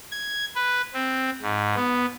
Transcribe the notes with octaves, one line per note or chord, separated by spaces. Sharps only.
G#6
B4
C4
G#2
B3